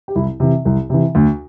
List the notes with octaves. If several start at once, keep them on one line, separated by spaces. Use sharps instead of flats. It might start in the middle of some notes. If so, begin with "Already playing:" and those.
G4
C2 E4
C3 E3
C2
C3 E3
D2